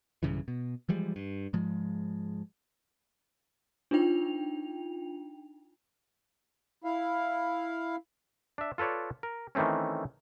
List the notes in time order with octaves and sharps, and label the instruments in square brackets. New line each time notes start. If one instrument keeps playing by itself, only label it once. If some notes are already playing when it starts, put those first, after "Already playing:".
[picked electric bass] B1 G2 C#3 E3
B2
E3 F3 G3 G#3
G2
G#2 F3 G#3
[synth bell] D4 D#4 F4 G5 F7
[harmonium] E4 F5
[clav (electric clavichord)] D4 E5
F4 A4 B4 C#5 D5
A#4
D#3 E3 A3 C4 C#4